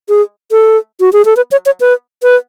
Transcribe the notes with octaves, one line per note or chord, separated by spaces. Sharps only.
G#4
A4
F#4
G#4
A4
B4
C#5
C#5
B4
B4